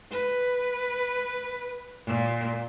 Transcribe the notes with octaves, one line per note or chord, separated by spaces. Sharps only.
B4
A#2